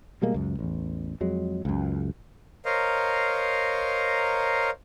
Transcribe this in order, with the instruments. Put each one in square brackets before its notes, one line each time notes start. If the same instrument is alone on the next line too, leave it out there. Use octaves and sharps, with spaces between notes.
[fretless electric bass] B2 G3 G#3 A#3
C#2 F#2
A1 E2
F2 F#3 G#3
C#2 F#2
[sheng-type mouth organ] A#4 C5 C#5 D#5 F5 A#5